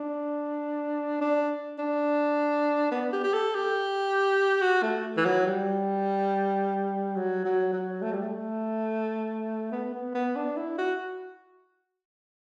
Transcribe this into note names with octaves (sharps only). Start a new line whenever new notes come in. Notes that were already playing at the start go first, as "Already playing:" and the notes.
Already playing: D4
D4
D4
B3
G4
G4
A4
G4
F#4
A3
E3
F#3
G3
F#3
F#3
F#3
A3
G3
A3
B3
B3
B3
D4
E4
F#4